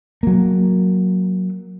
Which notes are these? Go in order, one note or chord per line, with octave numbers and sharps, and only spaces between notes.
F#3 A#3